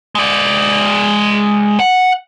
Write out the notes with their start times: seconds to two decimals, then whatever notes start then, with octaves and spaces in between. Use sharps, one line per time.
0.15 G#3 D5
1.79 F#5